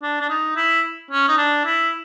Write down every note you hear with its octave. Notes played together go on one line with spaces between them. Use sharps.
D4
D4
D#4
E4
C#4
D#4
D4
E4